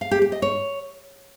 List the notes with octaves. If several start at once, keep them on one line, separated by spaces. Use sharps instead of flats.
F5
G4
G4
D#5
C#5